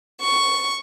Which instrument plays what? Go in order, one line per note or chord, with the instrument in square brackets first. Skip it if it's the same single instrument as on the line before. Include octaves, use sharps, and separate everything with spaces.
[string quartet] C#6